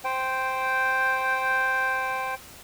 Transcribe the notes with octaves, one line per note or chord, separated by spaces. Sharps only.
C5 G5